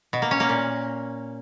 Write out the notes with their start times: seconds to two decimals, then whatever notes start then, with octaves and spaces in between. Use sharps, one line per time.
0.13 B2
0.22 A#3
0.31 C#4
0.40 A#3
0.49 A#2